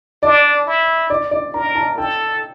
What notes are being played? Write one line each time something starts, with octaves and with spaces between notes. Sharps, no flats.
D4 D5
E4
D5
D5
A#4 A#5
A5
A4 G5